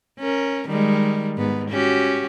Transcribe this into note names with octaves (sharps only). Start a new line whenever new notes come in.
C#4 A#4
D#3 G3 G#3
G#2 B3
C#4 F#4 G4